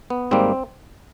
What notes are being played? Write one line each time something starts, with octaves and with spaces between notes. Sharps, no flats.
B3
G#2 D#3 G3 A#3 C4